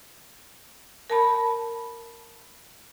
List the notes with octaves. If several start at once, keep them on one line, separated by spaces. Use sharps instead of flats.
A#4 A5 B5